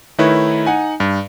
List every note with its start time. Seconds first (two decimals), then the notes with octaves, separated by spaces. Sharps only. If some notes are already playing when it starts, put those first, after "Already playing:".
0.18 D#3 A3 D#4 E4 B4 C#5
0.66 D#4 F#5 G#5
1.00 G2